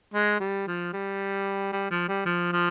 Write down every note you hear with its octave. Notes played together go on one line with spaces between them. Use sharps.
G#3
G3
F3
G3
G3
F3
G3
F3
F3